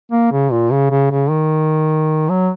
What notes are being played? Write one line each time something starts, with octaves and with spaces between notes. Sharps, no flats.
A#3
C#3
A#2
C#3
C#3
C#3
D#3
F#3